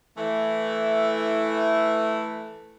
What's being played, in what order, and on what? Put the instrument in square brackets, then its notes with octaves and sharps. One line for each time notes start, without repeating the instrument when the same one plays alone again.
[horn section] E3 A3